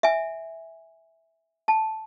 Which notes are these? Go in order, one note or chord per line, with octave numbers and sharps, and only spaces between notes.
E5 G#5
A5